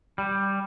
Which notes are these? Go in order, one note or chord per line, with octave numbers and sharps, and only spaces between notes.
G3